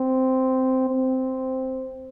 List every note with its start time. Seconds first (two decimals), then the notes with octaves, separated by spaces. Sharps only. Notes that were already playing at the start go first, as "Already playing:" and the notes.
Already playing: C4
0.90 C4